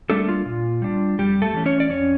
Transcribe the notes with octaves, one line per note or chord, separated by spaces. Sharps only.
G3 A3 A#3 D4 A4
F4
A#2
G3 D4
F2 G3 G4
A3 A4
E3 A3 C#4
C#4 C#5
D5
F2 C#4 C#5